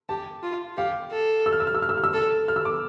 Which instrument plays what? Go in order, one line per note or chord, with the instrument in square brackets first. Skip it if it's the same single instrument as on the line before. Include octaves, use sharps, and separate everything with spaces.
[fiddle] G4 [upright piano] A5
[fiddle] F4
[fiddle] G4 [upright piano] F5
[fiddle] A4
[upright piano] E6
F6
E6
F6
E6
F6
E6
F6
E6
[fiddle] A4
[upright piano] F6
E6
D6